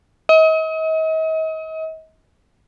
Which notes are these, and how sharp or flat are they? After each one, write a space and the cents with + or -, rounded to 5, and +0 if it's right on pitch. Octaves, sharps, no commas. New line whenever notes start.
D#5 +40